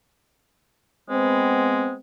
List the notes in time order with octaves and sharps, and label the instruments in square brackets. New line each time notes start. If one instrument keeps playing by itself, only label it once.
[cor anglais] G#3 [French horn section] B3 C4